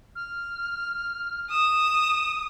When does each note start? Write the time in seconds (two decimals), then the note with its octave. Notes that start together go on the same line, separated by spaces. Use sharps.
0.15 F6
1.50 D#6 E7